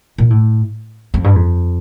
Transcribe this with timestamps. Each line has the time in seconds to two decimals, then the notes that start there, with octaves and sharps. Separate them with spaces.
0.18 A#2
0.30 A2
1.14 F2
1.24 G2
1.35 F2